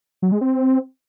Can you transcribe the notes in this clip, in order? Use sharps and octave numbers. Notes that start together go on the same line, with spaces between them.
F#3
G#3
C4